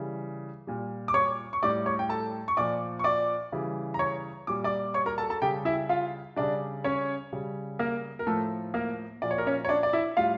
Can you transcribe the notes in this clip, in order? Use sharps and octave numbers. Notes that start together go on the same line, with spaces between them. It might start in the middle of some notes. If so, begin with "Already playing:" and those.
Already playing: C#3 E3 G3
A#2 G3
D6
C#5 C#6
C#6
A2 G3 D5 D6
C#5 C#6
G5
A4 A5
C#6
A#2 F3 D5 D6
C#6
D5 D6
C#3 E3 G3
A#5
C#5 C#6
A#2 G3 D6
D5 D6
C#5 C#6
A#4 A#5
A4 A5
A4 A5
C#3 G3 G4 G5
E4 E5
F4 F5
C#3 G3 D4 D5
C#4 C#5
C#3 G3
A#3 A#4
A#4
A2 F3 A3 A4
A#3 A#4
A#2 F3 D5
C#5
A#4
C#4 C#5
C#5
D4 D5
D5
E4 E5
A2 G3 F4 F5